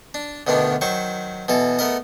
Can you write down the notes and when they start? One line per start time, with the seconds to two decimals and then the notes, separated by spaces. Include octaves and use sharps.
0.14 D4
0.47 D2 B2 D#3 B3 D4
0.81 D#3 F#3 C5 C#6
1.48 B2 E3 A4
1.79 A3 B3 A#4 D#5